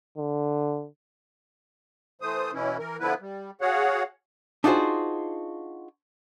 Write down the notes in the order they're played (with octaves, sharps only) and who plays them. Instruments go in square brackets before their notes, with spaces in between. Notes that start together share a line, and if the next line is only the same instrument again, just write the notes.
[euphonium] D3
[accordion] E3 A3 C5 D#6
B2 E3 C#4 E4
E3 A#4
D3 F3 B3 E4 B4
G3
F#4 G#4 C#5 F5 F#5
[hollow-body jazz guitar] D4 D#4 F4 F#4 G#4 C5